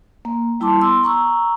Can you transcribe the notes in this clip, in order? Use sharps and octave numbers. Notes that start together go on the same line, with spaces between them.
A#3
G3 E4 A5 C6 D6
B3 C6 E6
A#5 C#6 E6